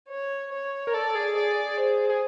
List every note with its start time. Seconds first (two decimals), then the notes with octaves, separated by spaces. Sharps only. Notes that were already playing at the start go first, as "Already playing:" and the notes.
0.09 C#5
0.51 C#5
0.87 A#4
0.94 A4 D5
1.15 G#4
1.35 G#4 D5
1.77 C5
2.09 G#4